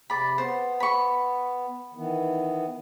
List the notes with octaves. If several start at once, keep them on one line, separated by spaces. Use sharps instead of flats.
C3 D5 B5
B3 C5
B5 C#6
D#3 E3 B3